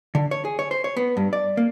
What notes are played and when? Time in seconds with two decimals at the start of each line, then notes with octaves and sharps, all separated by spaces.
0.15 D3
0.31 C#5
0.45 G#4
0.59 C#5
0.71 C5
0.84 C#5
0.97 B3
1.17 G2
1.33 D5
1.57 A#3